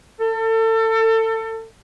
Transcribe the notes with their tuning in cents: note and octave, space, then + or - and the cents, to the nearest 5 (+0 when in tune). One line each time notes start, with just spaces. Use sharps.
A4 +30